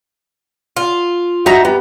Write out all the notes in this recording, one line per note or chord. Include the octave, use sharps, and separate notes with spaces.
F4
D#4 F#4 E5 A#5
B3 G4